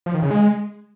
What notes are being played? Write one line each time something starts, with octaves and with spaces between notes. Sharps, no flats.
F3
D#3
C#3
G#3